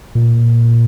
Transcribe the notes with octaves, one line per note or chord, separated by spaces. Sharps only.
A#2